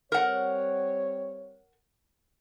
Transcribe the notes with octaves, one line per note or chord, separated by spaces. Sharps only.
G3 C4 A#4 C#5 F#5